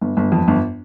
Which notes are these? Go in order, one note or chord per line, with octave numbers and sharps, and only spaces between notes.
G1
G1
F2
G1